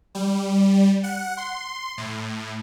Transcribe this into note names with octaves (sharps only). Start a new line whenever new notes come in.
G3
F#5
C6
A2